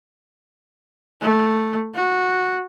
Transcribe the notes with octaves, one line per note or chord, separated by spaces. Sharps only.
A3
F#4